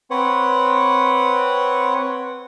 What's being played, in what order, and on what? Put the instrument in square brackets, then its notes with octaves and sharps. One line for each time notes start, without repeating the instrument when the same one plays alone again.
[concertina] C4 B4 C#5 F#5